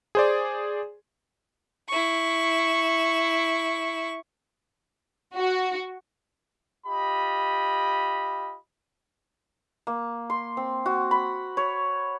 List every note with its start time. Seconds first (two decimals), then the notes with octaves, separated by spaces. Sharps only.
0.15 G#4 C5 D5
1.89 E4 C#6
5.36 F#4
6.86 F4 G4 D#5 B5
9.87 A#3
10.30 C6
10.57 C4
10.86 F#4
11.11 B5
11.57 C#5